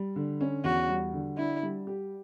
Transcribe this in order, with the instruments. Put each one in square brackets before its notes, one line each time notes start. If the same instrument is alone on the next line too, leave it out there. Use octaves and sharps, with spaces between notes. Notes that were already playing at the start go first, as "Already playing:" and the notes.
Already playing: [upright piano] G3
D3
C#4
[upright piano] E2 [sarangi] F#4
[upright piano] G3
D3
[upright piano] D4 [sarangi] E4
[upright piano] G3
G4